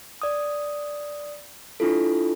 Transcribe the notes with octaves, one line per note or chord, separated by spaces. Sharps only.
D5 D#6
D4 E4 F4 A4